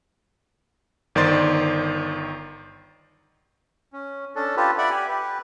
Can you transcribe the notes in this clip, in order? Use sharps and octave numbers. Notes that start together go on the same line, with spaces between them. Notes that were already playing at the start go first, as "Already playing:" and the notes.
G1 D#3 C5 D5 C6 A6
C#4
C#4 D4 A4
F4 G4 A4 B4
D5 E5 F#5 B5
G4 G#5
G4 B4